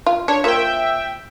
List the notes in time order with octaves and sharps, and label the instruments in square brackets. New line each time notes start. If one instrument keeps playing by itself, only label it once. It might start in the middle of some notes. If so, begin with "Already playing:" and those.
[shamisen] F4
[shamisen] D4 [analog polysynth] C#5
[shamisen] F3 A#3 [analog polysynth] E5 G5